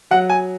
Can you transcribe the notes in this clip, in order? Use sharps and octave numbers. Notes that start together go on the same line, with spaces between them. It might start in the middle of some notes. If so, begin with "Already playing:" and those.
F#3 F#5
G#5